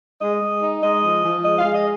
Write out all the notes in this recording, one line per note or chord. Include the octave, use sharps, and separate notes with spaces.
G#3 D#5
G#3
D#4
G#3 D#5
F3
F3
G#3 D#5
F5
G#3
D#5